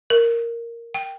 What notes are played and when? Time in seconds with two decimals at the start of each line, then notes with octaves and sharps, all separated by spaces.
0.10 A#4
0.94 G5